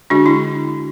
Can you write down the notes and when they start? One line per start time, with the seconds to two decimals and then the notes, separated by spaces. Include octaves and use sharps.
0.10 D3 G#3 D4 F#4
0.26 E4